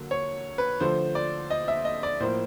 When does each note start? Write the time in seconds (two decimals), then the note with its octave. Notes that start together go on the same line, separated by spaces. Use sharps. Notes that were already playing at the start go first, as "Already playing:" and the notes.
Already playing: D3 F#3 A#3
0.11 C#5
0.58 B4
0.80 D3 F3 A3 C5
1.15 D5
1.50 D#5
1.68 E5
1.85 D#5
2.03 D5
2.20 A2 F3 A#3 C5